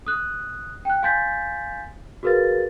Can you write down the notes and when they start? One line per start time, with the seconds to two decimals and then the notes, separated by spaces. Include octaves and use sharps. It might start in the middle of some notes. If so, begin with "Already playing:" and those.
0.07 D#6 F#6
0.85 G5 F#6
1.03 F5 G#5 C6 G6 A6 B6
2.23 F#4 G#4 A#4 B4 F5 A6